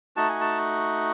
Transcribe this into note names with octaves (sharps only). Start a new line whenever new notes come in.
A3 D#4 F#4 A5
G#5
A5